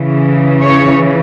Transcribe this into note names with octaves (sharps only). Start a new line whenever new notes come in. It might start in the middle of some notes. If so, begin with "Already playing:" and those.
Already playing: C#3 E3
C#5